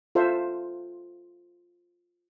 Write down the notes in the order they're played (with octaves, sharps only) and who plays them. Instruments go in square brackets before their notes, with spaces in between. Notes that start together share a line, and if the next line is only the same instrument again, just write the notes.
[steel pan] F4 A4 C5 E5 F5